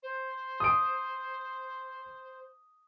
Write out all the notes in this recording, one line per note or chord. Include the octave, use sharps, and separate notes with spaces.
C5
D#6 D7